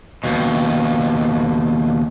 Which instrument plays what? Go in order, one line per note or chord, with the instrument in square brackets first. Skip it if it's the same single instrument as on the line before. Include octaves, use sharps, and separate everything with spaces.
[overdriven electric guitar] D#2 B2